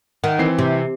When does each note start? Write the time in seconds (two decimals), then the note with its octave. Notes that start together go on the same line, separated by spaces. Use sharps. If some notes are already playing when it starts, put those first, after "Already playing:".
0.24 D#3 F#5
0.39 E3 C4 C7
0.59 C3